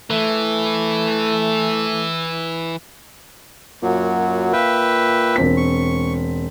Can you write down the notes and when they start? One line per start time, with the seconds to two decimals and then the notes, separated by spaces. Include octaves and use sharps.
0.10 E3 A3
3.83 F#2 A#2 F#3
4.53 B4 E5 F5 G5
5.36 E1 C4 B6
5.57 C#6